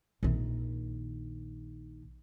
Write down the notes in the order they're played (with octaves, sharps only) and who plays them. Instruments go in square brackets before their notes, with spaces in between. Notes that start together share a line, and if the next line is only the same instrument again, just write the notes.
[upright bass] A#1 D#3